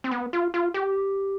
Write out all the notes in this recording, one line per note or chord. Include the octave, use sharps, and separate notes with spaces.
C4
B3
F4
F4
G4